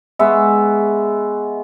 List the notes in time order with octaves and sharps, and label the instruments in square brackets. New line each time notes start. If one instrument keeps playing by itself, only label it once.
[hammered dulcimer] G#3 B3 E5 C#6